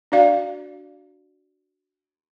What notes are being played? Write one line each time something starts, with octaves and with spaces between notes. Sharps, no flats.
D4 F#4 D5 F5